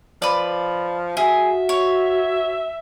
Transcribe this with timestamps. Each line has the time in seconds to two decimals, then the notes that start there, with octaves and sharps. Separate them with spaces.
0.22 F3 B4 D5
1.17 F#4 G#4 E5
1.69 C#5